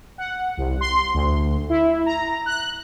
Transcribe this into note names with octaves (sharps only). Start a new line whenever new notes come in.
F#5
C2
C6
D2
E4
A#5
F#6